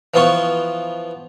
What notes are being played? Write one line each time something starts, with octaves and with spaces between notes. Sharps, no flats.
E3 F3 B3 F4 C6 C#6